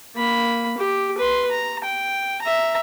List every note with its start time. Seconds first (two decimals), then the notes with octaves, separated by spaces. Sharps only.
0.16 A#3 B5
0.78 G4
1.18 B4 C6
1.51 A#5
1.84 G5
2.42 E5 A#5